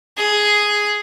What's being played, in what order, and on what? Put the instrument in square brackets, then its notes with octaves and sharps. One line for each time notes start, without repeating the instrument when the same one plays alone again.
[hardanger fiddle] G#4